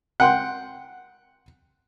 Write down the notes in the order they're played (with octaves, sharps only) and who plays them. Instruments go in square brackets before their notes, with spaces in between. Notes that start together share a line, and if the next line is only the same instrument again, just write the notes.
[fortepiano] F#5 G5 C6